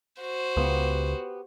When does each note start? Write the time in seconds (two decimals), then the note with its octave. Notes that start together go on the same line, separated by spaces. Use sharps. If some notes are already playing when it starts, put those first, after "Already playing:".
0.22 F#4 C5
0.57 C#2 B3 G4